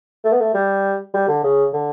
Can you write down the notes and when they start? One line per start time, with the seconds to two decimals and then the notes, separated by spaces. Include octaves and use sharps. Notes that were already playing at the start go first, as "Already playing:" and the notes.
0.24 A3
0.32 B3
0.40 A3
0.54 G3
1.14 G3
1.28 D3
1.44 C#3
1.73 D3